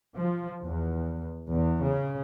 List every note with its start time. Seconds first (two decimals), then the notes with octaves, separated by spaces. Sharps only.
0.17 F3
0.62 E2
1.49 E2
1.85 C#3